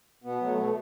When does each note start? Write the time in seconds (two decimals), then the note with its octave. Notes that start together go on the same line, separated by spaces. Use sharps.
0.24 B2 B3
0.41 F#3 A3
0.57 B2 A3